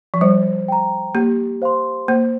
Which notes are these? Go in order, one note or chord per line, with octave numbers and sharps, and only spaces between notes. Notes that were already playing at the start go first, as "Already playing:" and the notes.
F3
G3 C5
G5 A#5
A#3 G4
C5 F5 C6
A#3 C5